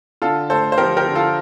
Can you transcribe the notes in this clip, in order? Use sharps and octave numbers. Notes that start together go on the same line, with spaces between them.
D3 F4 A4
A3 A4 C5
C5
F3 G4 A#4
G4 A#4
D3
F4 A4